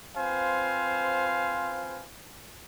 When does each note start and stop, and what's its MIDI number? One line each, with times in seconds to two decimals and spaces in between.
0.16 2.04 60
0.16 2.04 65
0.16 2.04 71
0.16 2.04 72
0.16 2.04 77
0.16 2.04 80